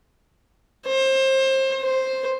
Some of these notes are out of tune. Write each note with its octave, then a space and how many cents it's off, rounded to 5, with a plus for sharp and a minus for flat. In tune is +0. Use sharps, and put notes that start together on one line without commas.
C5 +25
C5 +5